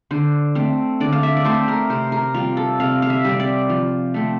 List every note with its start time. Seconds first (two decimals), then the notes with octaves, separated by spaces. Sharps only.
0.11 D3 C5
0.55 A3 C4
1.00 D3 D5
1.13 F5
1.23 E5
1.37 D5
1.45 A3 C4 C5
1.68 A#4
1.90 C3 C5
2.12 A#4
2.34 G3 C4 F4
2.57 A4
2.80 C3 F5
3.02 F5
3.10 E5
3.25 G3 C4
3.40 D5
3.70 F3
4.14 A3 C4